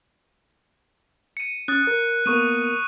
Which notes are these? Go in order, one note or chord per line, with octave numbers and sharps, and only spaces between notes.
C#7 D#7
C#4 D#6 F#6 A6
A#4
A#3 B3 A#4 C#6 D#6 D#7